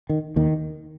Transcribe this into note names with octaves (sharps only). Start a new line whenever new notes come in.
D#3
D#2 D#3